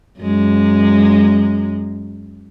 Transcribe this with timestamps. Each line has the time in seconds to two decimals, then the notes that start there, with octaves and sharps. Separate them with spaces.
0.20 F#2 G#3